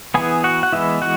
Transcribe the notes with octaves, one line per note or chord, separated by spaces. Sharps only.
E3 B3 G#4 G#5
F#4 F#5
F#5
E3 G#3 B3 E4 E5
F#4 F#5